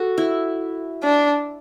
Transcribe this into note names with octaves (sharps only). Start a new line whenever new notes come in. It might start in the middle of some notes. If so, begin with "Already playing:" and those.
Already playing: F#4 A4
E4
D4